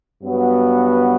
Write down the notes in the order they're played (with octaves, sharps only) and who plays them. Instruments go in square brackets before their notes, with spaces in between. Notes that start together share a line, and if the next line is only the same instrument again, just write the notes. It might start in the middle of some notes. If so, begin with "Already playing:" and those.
[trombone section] G2 F#3 B3 F#4